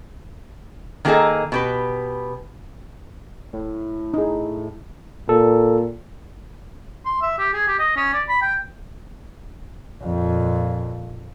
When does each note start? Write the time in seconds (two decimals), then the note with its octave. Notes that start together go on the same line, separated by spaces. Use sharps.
1.05 D#3 A#3 E4 G#4 A4 D#5
1.52 B2 G4 B4
3.53 A2
4.14 D#4 G#4
5.29 A#2 A4
7.06 C6
7.22 E5
7.38 G4
7.53 G#4
7.67 G4
7.79 D#5
7.96 C#4
8.13 D5
8.29 B5
8.42 G5
10.03 F2 A#2